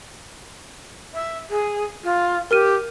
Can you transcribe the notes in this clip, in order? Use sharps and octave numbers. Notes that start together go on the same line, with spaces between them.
E5
G#4
F4
G4 A#4 F6 D#7